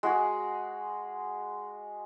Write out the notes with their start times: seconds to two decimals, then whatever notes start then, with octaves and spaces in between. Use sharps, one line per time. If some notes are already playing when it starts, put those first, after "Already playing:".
0.03 G#3 F#4 G#4